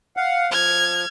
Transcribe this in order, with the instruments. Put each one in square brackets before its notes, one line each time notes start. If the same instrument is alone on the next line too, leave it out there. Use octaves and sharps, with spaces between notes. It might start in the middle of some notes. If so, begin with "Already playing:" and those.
[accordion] F5 F#5
[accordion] F3 [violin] F6 G#6